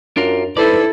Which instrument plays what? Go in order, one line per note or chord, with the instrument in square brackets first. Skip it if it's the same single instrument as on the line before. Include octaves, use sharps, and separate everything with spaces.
[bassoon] F#2 [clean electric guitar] D4 F4 A#4
[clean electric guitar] D#4 C5 D5 [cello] E4 A4 [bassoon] B4